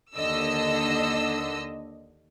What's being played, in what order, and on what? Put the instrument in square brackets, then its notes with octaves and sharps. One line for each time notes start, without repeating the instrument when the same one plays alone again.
[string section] D#2 D3 D#5 E6